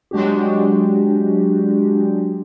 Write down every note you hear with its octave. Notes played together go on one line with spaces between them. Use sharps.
F#3 G#3 D4 F#4 G4